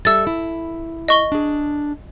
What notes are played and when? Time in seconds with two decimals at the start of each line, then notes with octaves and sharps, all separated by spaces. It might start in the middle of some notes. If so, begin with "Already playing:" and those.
0.05 G3 A4 E5 E6 A6
0.27 E4
1.08 D#5 C#6 G7
1.32 D4 G#4